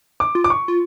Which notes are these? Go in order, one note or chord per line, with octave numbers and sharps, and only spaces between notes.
D6
F4
D6
C#6
F4